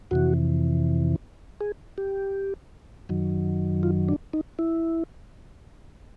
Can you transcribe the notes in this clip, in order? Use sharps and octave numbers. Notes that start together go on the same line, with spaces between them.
F2 C3 E3 F#4
G#4
G4
F#2 D#3 F#3
F4
D4
D#4
E4